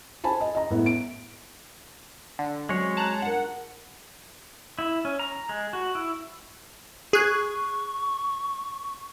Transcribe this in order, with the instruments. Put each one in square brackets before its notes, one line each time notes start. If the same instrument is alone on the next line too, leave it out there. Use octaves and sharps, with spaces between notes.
[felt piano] C5 G#5 A5 B5
D#5
D#5 A#5
A2 B3
D7
[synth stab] D3
[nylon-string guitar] F#3 C4 C#4 [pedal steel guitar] G#3 C#5
[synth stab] A5 A#5 F#6
[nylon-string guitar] D4 F4 A#4 [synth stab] F#5
[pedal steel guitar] E4
C#4
A#5
G#3
F#4
E4
[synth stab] G#4 F#6 [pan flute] C#6